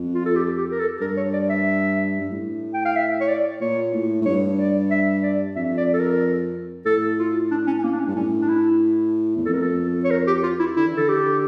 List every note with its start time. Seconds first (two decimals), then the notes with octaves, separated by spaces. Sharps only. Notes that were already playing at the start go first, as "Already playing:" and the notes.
Already playing: F2
0.14 F4
0.26 A4
0.36 G4
0.58 G4
0.72 A#4
0.80 A4
1.00 G2 A#4
1.17 C#5
1.33 D5
1.50 E5
2.21 G2
2.31 A2
2.74 G5
2.85 F5
2.96 E5
3.21 C#5
3.28 D5
3.61 A#2 C#5
3.93 A2
4.21 A2
4.26 G2 C#5
4.54 C#5
4.59 D5
4.91 E5
5.23 D5
5.56 F2 E5
5.77 D5
5.94 A4
6.00 A#4
6.85 A2 A4
7.19 F4
7.51 D4
7.67 C#4
7.79 C#4
7.84 A#3
7.92 D4
8.00 C#4
8.07 G2
8.15 A2 C#4
8.42 D4
8.49 E4
9.36 E2
9.46 F2 A4
9.53 A#4
9.61 A4
10.05 C#5
10.11 A#4
10.27 G4
10.43 F4
10.60 E4
10.76 D3 E4
10.86 E3
10.97 D3 A4
11.09 G4